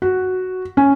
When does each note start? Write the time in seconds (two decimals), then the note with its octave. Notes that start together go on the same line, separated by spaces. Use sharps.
0.02 F#4
0.77 C#4